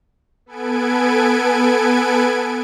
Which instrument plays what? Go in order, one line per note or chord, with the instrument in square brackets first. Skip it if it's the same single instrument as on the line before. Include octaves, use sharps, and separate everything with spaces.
[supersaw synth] B3 A4 B4 G#5 G#6 D7